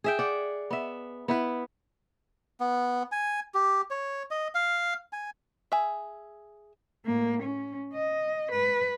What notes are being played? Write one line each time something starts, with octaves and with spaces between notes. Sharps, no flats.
G#4 E5 G5
D5 F#5
B3 E5
B3 E4 B4
B3
G#5
G4
C#5
D#5
F5
G#5
G#4 E5
A2 A#3
C#4
D#5
B4